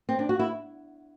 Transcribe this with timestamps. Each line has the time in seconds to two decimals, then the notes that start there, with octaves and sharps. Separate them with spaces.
0.09 C4
0.19 D4
0.29 F#4
0.39 E4